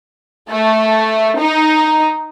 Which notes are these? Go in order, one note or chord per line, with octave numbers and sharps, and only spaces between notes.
A3
D#4